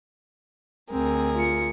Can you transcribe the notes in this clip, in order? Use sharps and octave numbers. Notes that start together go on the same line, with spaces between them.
D2 C4 G#4 A#4
F4 C#7